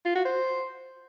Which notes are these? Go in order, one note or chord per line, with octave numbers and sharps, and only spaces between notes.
F4
F#4
C5